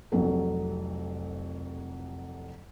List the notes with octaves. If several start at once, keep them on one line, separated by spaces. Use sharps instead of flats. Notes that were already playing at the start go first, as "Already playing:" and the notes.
F1 C2 F2 F#3 A4